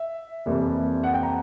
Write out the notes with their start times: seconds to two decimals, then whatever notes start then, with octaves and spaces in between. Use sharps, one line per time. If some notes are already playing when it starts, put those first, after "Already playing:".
Already playing: E5
0.46 F2 C3 E3 G3 A#3
1.04 F#5
1.14 G5
1.23 A#5